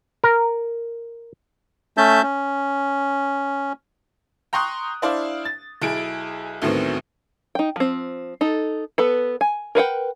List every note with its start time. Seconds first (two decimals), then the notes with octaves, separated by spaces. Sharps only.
0.24 A#4
1.97 A3 C#4 E5 A5 G6
2.23 C#4
4.53 G5 A#5 C6 C#6 D#6 F#6
5.02 D4 E4 C5 D5 F5
5.45 A6
5.82 B1 E4 G#4 D7
6.62 D2 A2 D#3 F#3 B3 C4
7.55 D#4 G5
7.76 F3 C4
8.41 D#4 A4
8.98 B3 A4 B4
9.41 G#5
9.75 A#4 B4 F#5 G5